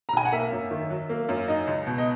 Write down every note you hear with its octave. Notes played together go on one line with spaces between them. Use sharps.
A#5
B1 G#5
F#5
A#3 E5
F#2
D#3
F#3
A#3
F#2
D#4 D#5
C#2
B2
D#5